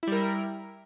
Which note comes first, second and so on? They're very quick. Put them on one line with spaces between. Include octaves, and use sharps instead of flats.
E4 G3 A#4